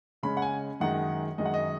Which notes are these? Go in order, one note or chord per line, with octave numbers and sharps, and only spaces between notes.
C#3 G#3 C#4 B5
F#5
G#5
F#2 D#3 G#3 D#4 F#5
F#2 D#3 G#3 D#4 D#5
F#5
D#5